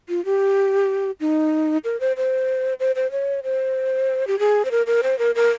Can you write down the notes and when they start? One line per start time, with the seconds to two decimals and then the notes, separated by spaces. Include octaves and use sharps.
0.09 F4
0.25 G4
1.20 D#4
1.84 A#4
2.00 C5
2.17 C5
2.80 C5
2.96 C5
3.11 C#5
3.44 C5
4.27 G4
4.39 G#4
4.65 C5
4.71 A#4
4.87 A#4
5.03 C5
5.19 A#4
5.35 A#4